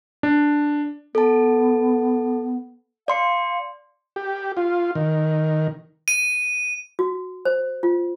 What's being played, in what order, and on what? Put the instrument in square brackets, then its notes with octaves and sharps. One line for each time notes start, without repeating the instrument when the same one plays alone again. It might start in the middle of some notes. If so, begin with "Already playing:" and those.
[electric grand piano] D4
[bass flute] B3 [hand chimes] A4 A5
[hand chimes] D5 C6 C#7 [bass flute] F5
[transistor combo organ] G4
F4
D#3
[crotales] D#7
[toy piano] F#4
C5
F4